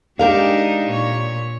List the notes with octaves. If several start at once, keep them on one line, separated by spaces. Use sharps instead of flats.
G#3 D4 D#4 G4 A#4 F5
A#2 C#5